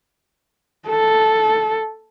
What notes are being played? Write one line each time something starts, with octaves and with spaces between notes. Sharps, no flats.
A4